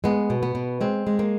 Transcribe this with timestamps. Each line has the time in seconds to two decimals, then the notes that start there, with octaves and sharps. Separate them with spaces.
0.04 G#3 B3
0.30 B2
0.43 B3
0.55 B2
0.81 G#3 C4
1.07 G#3
1.19 A#3